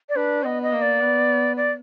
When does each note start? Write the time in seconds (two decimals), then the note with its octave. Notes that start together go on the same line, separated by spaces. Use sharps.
0.09 D5
0.16 D4 B4
0.44 B3 D#5
0.62 D#5
0.72 A#3
0.82 D5
1.01 B3
1.56 D5